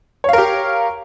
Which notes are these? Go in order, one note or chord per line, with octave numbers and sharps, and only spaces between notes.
G4 A#4 C#5 F5